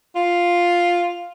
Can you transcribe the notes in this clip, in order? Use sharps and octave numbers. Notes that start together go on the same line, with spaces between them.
F4